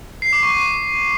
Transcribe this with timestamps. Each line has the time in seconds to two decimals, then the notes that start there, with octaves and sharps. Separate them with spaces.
0.22 C7
0.33 D6
0.43 C#6